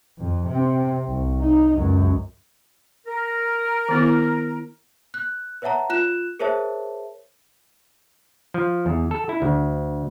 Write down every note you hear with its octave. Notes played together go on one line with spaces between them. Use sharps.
F2
C3 C4
C2
D#4
C#2 F#2
A#4
D#3 B3 E4
F#6
B4 C#5 E5 F#5 A5 A#5
F4 F#6 E7
G#4 A#4 C5 C#5 E5 A5
F3
E2
A4
E4
D2